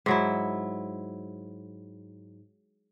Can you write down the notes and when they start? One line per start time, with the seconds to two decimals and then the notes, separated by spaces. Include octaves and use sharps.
0.06 G#2 F#3 E4